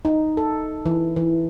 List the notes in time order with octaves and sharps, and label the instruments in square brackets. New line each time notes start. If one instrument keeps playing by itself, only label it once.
[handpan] D#4
A4
E3
E3